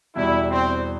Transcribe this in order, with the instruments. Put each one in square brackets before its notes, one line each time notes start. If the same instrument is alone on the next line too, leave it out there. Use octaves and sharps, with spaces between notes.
[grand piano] E2 B2 G3 [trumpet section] E4
[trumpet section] C4